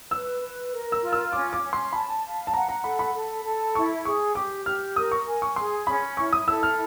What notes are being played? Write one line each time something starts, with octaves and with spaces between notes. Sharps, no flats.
B4 E6
B4
A#4
E6
F4
E6
C#4 D6
D6
C#4
C6
A5 B5
F5
A5
F#5 A#5
A#5
A4 B5
B5
A4
A4
E4 C#6
G#4 C#6
G4 D6
G4 F6
A#4 D#6
C#6
G#5
C#6
G#4 C6
C#4 B5
E4 C#6
D#6
A4 E6
F6